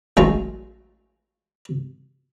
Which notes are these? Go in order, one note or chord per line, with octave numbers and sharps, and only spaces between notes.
A1 F#2 G#3 C#4 F4 A#5